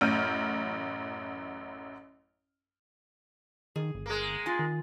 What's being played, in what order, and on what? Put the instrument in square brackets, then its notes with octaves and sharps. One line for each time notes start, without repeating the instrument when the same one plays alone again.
[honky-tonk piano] A1 F#2 F6 G6 D#7
[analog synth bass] D#3 [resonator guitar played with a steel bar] G#4
[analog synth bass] G1
[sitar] G#3 A#3
[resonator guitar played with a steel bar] F4 G#5
[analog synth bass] D#3